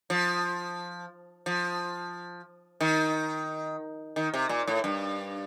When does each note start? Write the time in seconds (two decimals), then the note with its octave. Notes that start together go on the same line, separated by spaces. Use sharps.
0.10 F3
1.46 F3
2.81 D#3
4.16 D#3
4.34 C3
4.49 A#2
4.67 A2
4.84 G2